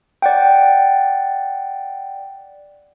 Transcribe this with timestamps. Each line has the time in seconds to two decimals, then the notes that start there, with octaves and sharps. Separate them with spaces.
0.22 D5 F#5 G5